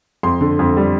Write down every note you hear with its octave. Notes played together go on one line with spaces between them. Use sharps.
F2 C6
D3
F2
G3